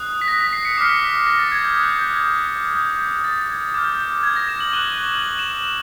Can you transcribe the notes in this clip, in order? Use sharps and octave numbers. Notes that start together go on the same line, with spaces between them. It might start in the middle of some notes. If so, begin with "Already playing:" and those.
Already playing: D#6 F#6
B6
A#6
B6
C7
C#7
D6 F6 B6
A#6
A6
G#6
G6
D#6 F#6 G#6
G6
G6
G#6
D#6 G6
A6
G#6
D6 F6 G6
G#6
A#6
E7
F#7
C#6 F#6 G7
F#7
F#7
E7